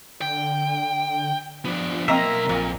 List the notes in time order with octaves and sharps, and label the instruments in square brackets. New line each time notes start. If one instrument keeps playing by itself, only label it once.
[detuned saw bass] D3 [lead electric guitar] G5
[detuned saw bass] F3 [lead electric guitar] B3 D4
[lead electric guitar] B1 A#5 [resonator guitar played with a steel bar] A#3 C4 D#5 [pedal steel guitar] A#4 E5
[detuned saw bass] A#1 [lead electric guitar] F2 [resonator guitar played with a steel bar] A#2